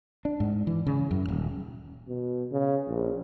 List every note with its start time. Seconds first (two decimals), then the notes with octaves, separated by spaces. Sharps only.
0.25 D4
0.40 G#2
0.67 E3
0.87 C#3
1.11 F#2
1.28 D#1
2.08 B2
2.52 C#3
2.88 A#1